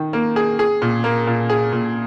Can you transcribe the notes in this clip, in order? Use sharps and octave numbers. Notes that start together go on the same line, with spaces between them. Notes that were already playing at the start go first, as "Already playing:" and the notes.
Already playing: D#3
A#3
G#4
G#4
A#2
A#3
A#2
G#4
A#2